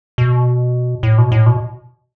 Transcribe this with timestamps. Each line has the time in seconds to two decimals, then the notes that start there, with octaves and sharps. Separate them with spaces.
0.18 B2
1.03 A2
1.18 B2
1.32 A2
1.46 B2